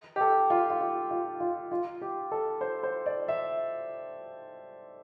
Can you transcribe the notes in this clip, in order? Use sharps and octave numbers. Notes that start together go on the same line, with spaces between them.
G4
A4
F4
F4
G4
F4
F4
F4
G4
A4
C5
C5
D5
E5